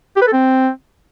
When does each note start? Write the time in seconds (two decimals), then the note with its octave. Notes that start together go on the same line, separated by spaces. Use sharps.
0.16 G4
0.22 B4
0.27 A4
0.33 C4